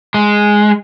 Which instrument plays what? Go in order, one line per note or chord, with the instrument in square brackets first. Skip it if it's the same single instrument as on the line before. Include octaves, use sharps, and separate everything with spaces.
[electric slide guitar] G#3